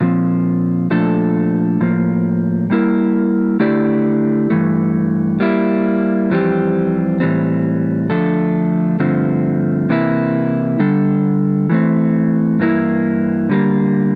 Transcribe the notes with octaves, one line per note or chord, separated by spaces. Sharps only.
A#2 F3 C4
A#2 F3 A3 D4 A4
A2 F3 A#3
G3 A#3 E4 A#4
D3 A3 E4 G4 D5
G2 E3 A3
G3 A#3 E4
F2 E3 G3 C4 G4
A2 E3 G3 C4
D3 F3 A3 D4 A4
G2 D3 F3 A3 C4
C3 E3 A#3 E4
D3 G3 D4 A4
E3 A3 C4
G2 E3 A#3 E4
D3 G3 A#3